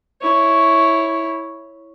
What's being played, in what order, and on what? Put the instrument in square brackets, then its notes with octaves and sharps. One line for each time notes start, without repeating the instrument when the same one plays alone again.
[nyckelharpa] E4 C#5